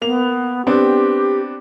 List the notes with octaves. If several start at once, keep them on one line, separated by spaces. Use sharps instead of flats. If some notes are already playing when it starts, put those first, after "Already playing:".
A#3 B3 F7
B3 C4 D4 G4